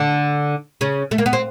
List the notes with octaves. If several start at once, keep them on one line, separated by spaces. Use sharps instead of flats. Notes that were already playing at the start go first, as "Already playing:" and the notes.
Already playing: D3 D4
C#3 C#4
A3
A#3
B3
C4